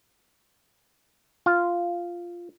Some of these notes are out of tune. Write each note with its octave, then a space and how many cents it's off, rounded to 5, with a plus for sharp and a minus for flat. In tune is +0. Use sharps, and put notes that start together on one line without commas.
F4 -5